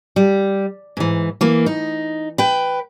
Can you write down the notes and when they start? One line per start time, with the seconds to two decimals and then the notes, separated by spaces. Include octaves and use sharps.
0.16 G3
0.97 G#2 E3
1.41 E3 A#3
1.66 D#4
2.38 B4 G5